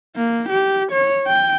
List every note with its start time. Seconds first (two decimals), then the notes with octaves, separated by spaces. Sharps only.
0.16 A#3
0.49 G4
0.92 C#5
1.27 G5